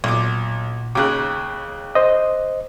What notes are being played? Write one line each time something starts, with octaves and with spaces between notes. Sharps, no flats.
B1 A#2 D6
D#2 C#3 D6 F#6
C5 D#5